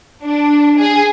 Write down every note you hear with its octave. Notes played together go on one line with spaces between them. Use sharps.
D4
G#4